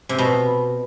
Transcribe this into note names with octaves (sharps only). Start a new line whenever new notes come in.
C3
B2